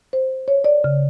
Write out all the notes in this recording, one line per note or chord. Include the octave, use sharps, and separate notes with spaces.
C5
C#5
D5
C#3